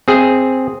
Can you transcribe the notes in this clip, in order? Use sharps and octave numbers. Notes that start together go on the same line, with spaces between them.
C4 G#4